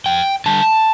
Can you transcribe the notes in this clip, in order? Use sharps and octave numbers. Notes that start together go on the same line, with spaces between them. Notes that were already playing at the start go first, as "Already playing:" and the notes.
F2 G5
D3 G3 A5